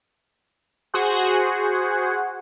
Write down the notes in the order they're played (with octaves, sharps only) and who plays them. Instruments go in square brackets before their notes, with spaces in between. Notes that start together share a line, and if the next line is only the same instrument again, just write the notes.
[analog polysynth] F#4 G#4 C5 F#5